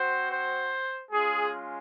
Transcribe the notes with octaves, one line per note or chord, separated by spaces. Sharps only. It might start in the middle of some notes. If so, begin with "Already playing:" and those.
Already playing: C4 F#4 C5
C5
G#3 C#4 F4 G#4